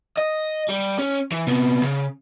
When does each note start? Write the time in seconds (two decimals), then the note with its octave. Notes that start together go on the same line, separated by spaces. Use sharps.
0.18 D#5
0.69 G3
0.99 C#4
1.32 E3
1.47 C3 B3
1.82 C#3